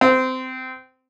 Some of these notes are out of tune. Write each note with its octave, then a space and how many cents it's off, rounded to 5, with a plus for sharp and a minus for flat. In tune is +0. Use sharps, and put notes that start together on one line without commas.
C4 -20